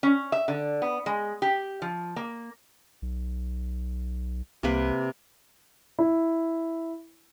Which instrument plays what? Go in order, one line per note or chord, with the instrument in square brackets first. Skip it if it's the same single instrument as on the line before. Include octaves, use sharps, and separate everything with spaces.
[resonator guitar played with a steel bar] C#4
E5
D3
B3
G#3
G4
F3
A#3
[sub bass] B1
[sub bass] C2 [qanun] C3 A#3 B4
[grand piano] E4